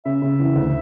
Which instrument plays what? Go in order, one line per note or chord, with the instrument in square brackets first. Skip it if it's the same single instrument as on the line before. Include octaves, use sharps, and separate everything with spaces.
[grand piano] C#3 [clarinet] E5
[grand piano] C#3
E3
D2